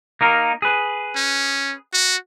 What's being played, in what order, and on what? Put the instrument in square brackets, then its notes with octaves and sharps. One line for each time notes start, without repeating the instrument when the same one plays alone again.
[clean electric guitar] A#3 D#4 A#4
G#4 B4
[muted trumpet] C#4
F#4